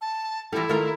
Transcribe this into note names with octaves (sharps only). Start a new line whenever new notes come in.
A5
E3 G3 E4 F4 A4
D#3 A3 F4 A#4 A#5